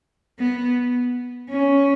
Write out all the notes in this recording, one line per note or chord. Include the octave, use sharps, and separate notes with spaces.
B3
C#4